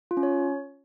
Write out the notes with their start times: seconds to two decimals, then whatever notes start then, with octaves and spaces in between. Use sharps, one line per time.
0.11 F4
0.17 C#4
0.23 C#5